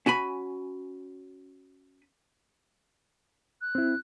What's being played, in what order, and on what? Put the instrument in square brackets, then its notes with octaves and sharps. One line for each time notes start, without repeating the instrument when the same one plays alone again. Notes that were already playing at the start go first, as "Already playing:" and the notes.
[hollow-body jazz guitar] C#4 F#4 G#5 B5
[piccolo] F#6
[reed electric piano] C4 E4